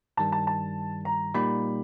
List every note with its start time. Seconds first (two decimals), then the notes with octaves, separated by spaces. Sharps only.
0.17 G2 D#3 G3 A5
0.32 A5
0.47 A5
1.05 A#5
1.34 A#2 G3 A#3 D#4 G4 B5